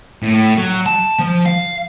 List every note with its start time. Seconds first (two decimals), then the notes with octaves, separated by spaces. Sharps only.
0.23 A2
0.57 F#3
0.86 A5
1.19 F3
1.46 F5